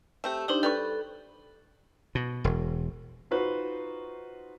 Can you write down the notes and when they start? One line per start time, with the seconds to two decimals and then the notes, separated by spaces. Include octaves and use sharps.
0.24 A3 C4 G4 E5
0.48 G3 D4 D#4 G4 C5
0.63 G3 A4 B4 C#6
2.15 B2
2.44 E1
3.31 D#4 F4 F#4 B4 C5